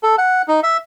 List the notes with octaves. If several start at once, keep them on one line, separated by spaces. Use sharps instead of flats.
A4
F#5
D#4
E5